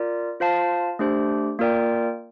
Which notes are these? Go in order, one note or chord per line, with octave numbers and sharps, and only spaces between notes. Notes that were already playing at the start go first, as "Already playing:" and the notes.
Already playing: F4 A#4 D5
F4 C5 F5 A5
A3 D4 G4 C5
A#3 F4 A#4 D5 G5